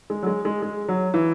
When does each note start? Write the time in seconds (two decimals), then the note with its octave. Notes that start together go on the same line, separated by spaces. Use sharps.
0.10 G#3
0.23 F#3
0.27 G#3
0.45 G#3
0.62 G#3
0.88 F#3
1.14 E3